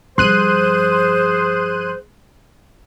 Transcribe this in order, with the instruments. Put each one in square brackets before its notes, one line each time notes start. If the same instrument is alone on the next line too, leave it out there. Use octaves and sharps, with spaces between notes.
[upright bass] G2 F3 [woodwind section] G#4 C5 [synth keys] C6 F#6 D#7